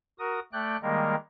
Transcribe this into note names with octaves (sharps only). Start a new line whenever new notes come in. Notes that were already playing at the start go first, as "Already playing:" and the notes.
F#4 A#4 D#6
A3 D5 G5 F#6
D#3 G3 G#3 A#3 A#4